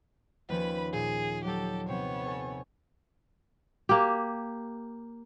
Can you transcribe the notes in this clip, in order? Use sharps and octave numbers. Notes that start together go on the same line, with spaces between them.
D#2 F3 C#4 B4 B5
A#2 G#4
F#3 G4 A4
C3 B3 C4 C#5
A4 G#5
A#3 G4